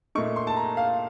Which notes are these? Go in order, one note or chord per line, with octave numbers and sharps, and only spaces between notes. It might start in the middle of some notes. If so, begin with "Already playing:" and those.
A#2 A3 D#4 C#6
C6
A5
A#5
F5